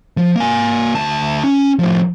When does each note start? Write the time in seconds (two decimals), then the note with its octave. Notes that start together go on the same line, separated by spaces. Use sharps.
0.17 F3
0.36 A#3 G#5
0.94 D2 A5
1.44 C#4
1.79 A2 F3